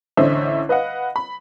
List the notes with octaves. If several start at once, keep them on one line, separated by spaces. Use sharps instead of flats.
A1 D3 C#4 C5 D#5 E5
B4 D#5 F5 F#5
B5